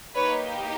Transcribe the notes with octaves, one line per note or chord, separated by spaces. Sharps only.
A#3 D#4 G4 B4 C#5